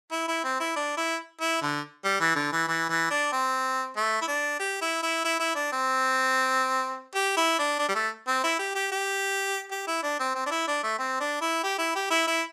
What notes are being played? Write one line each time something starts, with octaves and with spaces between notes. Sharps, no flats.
E4
E4
C4
E4
D4
E4
E4
D3
G3
E3
D3
E3
E3
E3
D4
C4
A3
E4
D4
G4
E4
E4
E4
E4
D4
C4
G4
E4
D4
D4
G3
A3
C4
E4
G4
G4
G4
G4
E4
D4
C4
C4
D4
E4
D4
A3
C4
D4
E4
G4
E4
G4
E4
E4